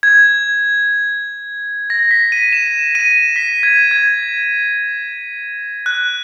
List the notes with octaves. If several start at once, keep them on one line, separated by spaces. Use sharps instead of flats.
G#6
A#6
B6
D#7
E7
D#7
B6
G#6
G#6
F#6